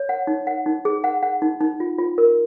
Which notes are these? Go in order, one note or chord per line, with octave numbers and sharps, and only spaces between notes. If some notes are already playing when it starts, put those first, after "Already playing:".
Already playing: C#5
F#5
D#4
F#5
D#4
G#4
F#5
F#5
D#4
D#4
F4
F4
A#4